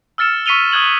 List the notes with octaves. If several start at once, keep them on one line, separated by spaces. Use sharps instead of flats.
E6 F6 A6 C#7 E7
C#6 B6 C#7 D#7 F7 G7
D#6 F#6 G#6 F#7